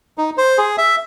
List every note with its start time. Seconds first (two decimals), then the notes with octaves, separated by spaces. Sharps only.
0.18 D#4
0.38 C5
0.58 G#4
0.78 E5